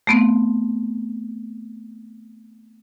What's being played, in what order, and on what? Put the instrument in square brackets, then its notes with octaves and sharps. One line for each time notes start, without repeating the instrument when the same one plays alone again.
[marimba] A3 B3 C4